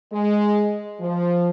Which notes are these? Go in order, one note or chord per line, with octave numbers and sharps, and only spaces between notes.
G#3
F3